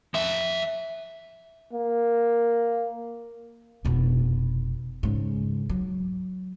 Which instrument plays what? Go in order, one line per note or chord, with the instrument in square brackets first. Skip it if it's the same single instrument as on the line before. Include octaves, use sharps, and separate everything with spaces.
[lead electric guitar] F3 E5
[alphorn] A#3
[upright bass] F1 B2
G#2 C#3
F#3